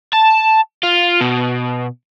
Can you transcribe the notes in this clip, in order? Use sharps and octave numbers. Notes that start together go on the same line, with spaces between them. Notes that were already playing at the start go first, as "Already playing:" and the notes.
A5
F4
B2